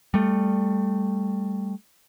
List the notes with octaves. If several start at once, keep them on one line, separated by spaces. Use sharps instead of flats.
G3 A3